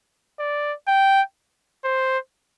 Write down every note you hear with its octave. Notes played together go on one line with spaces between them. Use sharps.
D5
G5
C5